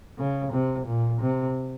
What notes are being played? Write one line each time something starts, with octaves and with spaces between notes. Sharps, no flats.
C#3
C3
A#2
C3